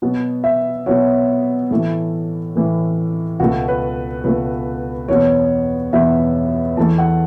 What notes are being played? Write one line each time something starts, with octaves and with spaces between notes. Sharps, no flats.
B2 F#3 B3
E5
B2 F#3 B3 C#5
A2 E3 A3
A2 E3 A3
C#2 B2 A3 F#4
B4
C#2 B2 A3 B4
E2 B2 B3 C#5
E2 B2 B3 E5
E2 E3 A3 A5
F#5